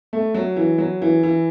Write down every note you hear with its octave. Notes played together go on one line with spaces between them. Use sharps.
A3
F#3
E3
F#3
E3
E3